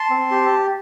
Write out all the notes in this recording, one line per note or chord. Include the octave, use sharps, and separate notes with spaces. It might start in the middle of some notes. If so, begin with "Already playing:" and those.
Already playing: A5 C6
C4
G4